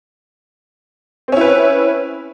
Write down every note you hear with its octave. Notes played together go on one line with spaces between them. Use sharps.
C4 C#4 E4 B4